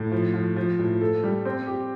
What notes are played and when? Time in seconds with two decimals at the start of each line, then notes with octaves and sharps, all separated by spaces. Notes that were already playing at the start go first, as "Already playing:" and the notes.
Already playing: A2
0.12 F3
0.34 F3
0.57 F3
0.79 A2
1.01 A4
1.24 G3
1.45 C4
1.67 G4